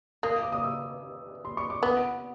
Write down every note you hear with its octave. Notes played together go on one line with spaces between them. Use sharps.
A#3 D#6
D6
D#6
E6
C6
C#6
D6
B3 D#6